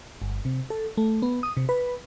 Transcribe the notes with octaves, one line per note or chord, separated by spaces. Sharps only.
G1
C3
A4
A3
B3
D#6
C3
B4